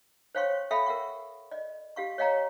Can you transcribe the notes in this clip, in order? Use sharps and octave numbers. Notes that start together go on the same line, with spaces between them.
C5 C#5 F5 G5 C6 C#6
A4 E5 F5 G5 B5
A#4 E5 F#5 C#6
D5 D#5
G4 F5 C#6
C#5 D#5 F5 G5 A#5 C#6